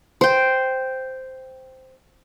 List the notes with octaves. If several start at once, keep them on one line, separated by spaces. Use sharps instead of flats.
C5 G5